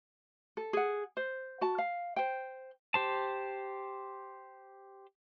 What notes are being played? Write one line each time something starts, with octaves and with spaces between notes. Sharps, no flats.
A4
G#4 F#5
C5
F#4 A5
F5
C5 G5
G4 C5 A5